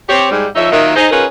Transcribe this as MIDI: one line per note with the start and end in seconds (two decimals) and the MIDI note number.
0.09 0.28 60
0.09 0.28 67
0.09 0.28 73
0.31 0.47 44
0.31 0.47 55
0.55 0.70 53
0.55 0.70 63
0.55 0.70 73
0.55 0.70 76
0.72 0.94 51
0.72 0.94 54
0.72 0.94 58
0.72 0.94 65
0.72 0.94 75
0.72 0.94 76
0.96 1.09 63
0.96 1.09 68
0.96 1.09 72
1.11 1.25 61
1.11 1.25 63
1.11 1.25 65
1.11 1.25 68
1.11 1.25 70
1.11 1.25 71